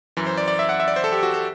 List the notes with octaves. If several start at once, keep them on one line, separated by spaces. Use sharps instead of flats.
F#2 E3
C5
D5
D5
E5
F#5
E5
D5
C5
A4
G4
F#4
A4